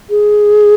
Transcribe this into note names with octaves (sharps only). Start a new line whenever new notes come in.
G#4